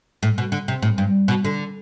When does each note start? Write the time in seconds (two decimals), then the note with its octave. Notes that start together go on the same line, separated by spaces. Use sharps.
0.23 A2
0.38 B2
0.52 D3
0.68 C3
0.82 A2
0.98 G2
1.28 B2
1.45 D3